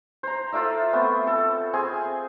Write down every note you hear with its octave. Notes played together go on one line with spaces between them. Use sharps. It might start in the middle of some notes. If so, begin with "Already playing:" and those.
C5 A#5
F4 A4 D5 E5
A3 B3 C4
A4
C4 G#4 G#5 C6